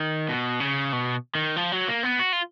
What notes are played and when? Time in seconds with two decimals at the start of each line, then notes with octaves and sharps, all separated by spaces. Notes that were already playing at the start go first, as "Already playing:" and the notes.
Already playing: D#3
0.29 B2
0.60 C#3
0.93 B2
1.35 D#3
1.56 F3
1.72 F#3
1.88 A#3
2.03 B3
2.19 F#4
2.33 F4